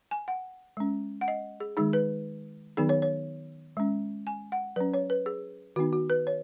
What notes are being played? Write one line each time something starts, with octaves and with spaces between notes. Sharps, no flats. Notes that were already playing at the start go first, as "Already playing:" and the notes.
G#5
F#5
G#3 C#4
F#5
D#5
G#4
D#3 G#3 D#4 G#4
B4
D#3 F#3 B3 D#4 G#4
C#5
C#5
G#3 C#4
G#5
F#5
F#3 C#4 B4
C#5
B4
G#4
D#3 B3 D#4 F#4
F#4
B4
C#5